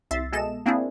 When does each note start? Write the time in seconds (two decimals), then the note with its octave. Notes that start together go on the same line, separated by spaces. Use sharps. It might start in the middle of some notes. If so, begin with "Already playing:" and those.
0.11 C2 E5 C6 A6
0.32 B2 G#3 A4 D#5 E7
0.66 A#3 C4 D4 E4 G#4